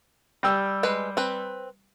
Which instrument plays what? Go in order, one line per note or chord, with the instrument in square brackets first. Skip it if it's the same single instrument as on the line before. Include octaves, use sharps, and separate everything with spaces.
[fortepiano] G3 G5 E6
[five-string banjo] G#3 B4
C4 B4